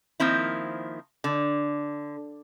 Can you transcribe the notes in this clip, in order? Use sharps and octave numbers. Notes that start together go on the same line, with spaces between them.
D#3 F3 A#3 C4 E4
D3